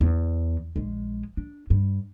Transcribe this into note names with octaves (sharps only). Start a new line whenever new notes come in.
E2
A#1 G#3
D4
G2